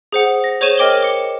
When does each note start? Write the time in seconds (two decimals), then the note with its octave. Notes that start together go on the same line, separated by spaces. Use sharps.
0.13 G#4 C5 F#5
0.44 A#6
0.61 G#4 C5 C#5 C#6 D#7 E7
0.78 A#4 D#5 G5 D6 F#7 G7
1.02 D6 C#7